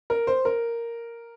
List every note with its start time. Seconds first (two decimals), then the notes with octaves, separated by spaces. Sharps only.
0.10 A#4
0.27 C5
0.45 A#4